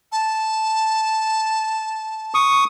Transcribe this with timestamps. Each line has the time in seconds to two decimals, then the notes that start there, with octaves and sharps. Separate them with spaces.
0.12 A5
2.34 C#6 D#6